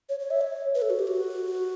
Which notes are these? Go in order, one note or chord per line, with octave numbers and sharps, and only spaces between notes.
C#5
C#5
E5
C#5
B4
A4
F#4
G4
F#4